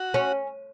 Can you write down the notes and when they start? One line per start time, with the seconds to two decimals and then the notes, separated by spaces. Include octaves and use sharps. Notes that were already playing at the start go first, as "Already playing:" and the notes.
Already playing: F#4
0.14 C#4